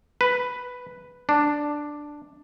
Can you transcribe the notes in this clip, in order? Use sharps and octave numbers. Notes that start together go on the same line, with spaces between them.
B4
D4